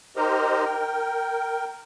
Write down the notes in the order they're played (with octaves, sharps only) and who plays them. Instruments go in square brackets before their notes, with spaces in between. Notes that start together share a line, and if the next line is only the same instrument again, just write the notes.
[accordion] D#4 G4 A#4 C5 D#5 A#5
A#4 G5